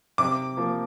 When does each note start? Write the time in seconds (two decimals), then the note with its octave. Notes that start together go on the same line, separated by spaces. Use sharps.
0.18 C3 D6
0.57 F3 A#3